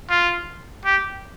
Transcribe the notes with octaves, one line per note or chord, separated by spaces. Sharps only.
F4
G4